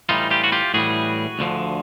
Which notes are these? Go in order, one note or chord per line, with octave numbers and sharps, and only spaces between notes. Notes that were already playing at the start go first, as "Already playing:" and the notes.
A2 E3 G3 D#4 F4
F4 G4
F#4
F4 G4
A2 E3 G3 F#4 G#4
D2 D3 F3